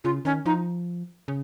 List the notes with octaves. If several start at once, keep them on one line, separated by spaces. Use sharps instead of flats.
C#3 F4
D#3 C#4
F3 D#4
C#3